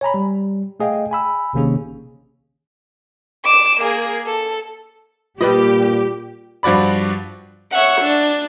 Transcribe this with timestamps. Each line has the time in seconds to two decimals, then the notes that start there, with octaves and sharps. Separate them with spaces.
0.01 C#5 G#5 A#5 B5
0.14 G3
0.80 A3 G#4 D#5 F5 G5
1.11 G#5 B5 E6
1.53 A1 C3 D#3 A#3 C#4 G#4
3.44 D6 E7
3.80 A#3 G#4
4.27 A4
5.41 A#2 G3 F4 G4 B4 D#5
6.63 G2 F3 F#4 D5 B5
7.70 C#5 E5 F#5
8.00 D4